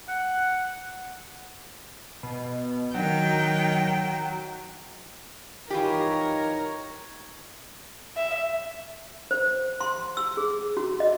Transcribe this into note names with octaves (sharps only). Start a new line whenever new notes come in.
F#5
B2
D#3 F#3 G5
E3 D#4 F4 G4 A#4 C#5
E5
C5
C6
E6
G#4
F#4
D#5